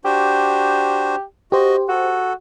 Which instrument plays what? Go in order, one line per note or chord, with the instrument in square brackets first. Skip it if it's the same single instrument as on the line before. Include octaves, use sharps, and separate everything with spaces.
[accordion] D4 F#4 C5 [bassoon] G4
[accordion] F#4 D#5 [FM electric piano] G4 C5
[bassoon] F#4 [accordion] A4